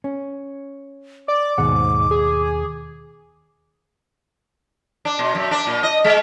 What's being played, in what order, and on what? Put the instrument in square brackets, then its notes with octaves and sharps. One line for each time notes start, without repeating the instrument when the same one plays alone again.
[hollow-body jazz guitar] C#4
[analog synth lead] D5 [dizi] D6
[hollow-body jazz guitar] D#2 B2 F#5 [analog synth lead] G#2
[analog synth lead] G#4
[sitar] D4
B2
F#2
D4
A#2
D#5
G#3